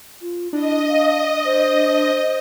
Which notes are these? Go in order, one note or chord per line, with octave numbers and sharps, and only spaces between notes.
F4
D4 E4 D#5
F5
C5